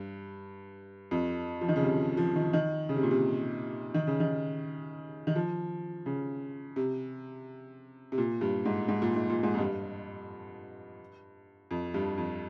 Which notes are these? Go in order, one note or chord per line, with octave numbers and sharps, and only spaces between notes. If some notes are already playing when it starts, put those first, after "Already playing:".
Already playing: G2
F2
F3
D#3
C#3
C3
F3
D#3
D#3
C#3
C3
A#2
C3
D#3
C#3
D#3
D#3
F3
C#3
C3
C3
A#2
G2
G#2
G#2
A#2
G#2
A#2
G#2
F2
G2
F2
G2
F2